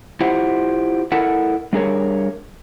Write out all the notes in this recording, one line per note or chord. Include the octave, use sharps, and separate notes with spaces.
E4 F4 G4 C5 F#5
E4 A4 A#4 F#5
G3 D4 G#4 A#4 C#5